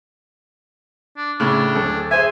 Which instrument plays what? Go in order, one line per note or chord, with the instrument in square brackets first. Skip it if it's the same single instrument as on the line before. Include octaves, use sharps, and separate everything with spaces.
[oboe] D4
[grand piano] A2 C#3 [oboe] D4
[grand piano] D1 A4
[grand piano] G#4 C5 E5 [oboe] G#5